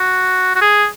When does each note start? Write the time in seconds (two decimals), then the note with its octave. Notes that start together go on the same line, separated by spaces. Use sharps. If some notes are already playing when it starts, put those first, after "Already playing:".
Already playing: F#4
0.55 F#4
0.61 G#4